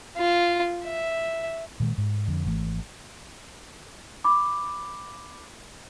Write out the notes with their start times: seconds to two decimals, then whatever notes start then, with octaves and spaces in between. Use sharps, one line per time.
0.17 F4
0.85 E5
1.80 A#2 D#3 G#3
1.98 G#2
2.28 F2 D3
2.45 G#1 E3 A3
4.24 B5 D6